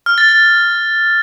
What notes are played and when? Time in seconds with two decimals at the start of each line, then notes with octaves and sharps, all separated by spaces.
0.06 F6
0.18 A6
0.29 A6